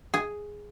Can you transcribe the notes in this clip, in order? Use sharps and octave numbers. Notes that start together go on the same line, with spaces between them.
G#4